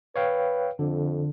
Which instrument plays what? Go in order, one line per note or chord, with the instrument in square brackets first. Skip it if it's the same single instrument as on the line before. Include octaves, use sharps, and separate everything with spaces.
[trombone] B4 [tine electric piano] C#5 F5 G5
[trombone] F2 [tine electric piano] D3